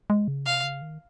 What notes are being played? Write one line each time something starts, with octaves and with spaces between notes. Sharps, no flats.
G#3
C#3
C3 F5
C#3
D#3